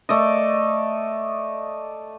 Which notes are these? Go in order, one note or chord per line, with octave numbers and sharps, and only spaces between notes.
A3 D5 D#5